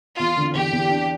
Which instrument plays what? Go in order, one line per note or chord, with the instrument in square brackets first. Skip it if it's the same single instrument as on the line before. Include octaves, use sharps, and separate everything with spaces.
[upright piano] E2 [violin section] F4
[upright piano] D3
[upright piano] E2 [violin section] G4
[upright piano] E2
D4